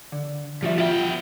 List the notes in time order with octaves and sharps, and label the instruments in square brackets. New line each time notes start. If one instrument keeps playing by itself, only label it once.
[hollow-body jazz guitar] D3
[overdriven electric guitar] F3 [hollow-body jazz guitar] G3 F#4 E5
[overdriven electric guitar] B3 G5 [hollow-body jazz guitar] F4 E5